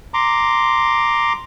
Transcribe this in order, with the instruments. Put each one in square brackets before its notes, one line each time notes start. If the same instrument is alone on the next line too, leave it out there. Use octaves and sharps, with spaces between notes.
[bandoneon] A#5 C6 D6